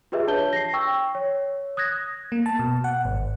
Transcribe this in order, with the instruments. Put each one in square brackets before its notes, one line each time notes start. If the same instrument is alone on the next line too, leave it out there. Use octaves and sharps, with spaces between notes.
[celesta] F4 G4 G#4 B4 D#5 E5
D4 C#5 A5 G6 G7
A#6 C7
G5 C#6 E6
C#5
D#6 F#6 G#6 A#6
[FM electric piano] A#3
A5
B2
F#5
G#1